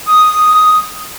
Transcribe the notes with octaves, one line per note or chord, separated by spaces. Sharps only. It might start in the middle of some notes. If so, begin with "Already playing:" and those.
D#6